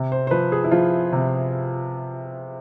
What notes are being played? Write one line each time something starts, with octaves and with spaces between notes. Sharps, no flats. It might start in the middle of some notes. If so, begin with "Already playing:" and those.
Already playing: C3
C5
C5
F3 B4
G#4
E4
F3 F4
C3